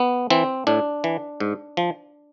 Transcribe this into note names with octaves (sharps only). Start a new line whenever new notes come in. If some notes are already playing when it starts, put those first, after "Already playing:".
Already playing: B3
E3 C4
A2 D4
E3
G#2
F3